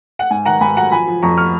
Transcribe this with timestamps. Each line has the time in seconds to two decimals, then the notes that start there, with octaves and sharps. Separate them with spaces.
0.19 F#5
0.31 G#2 G#5
0.45 D#3 F#5 A#5
0.61 G#2 G#5 B5
0.76 F#3 F#5 A#5
0.92 F3 G#5 B5
1.08 F3
1.23 F2 A#5 C#6
1.37 C#6 F6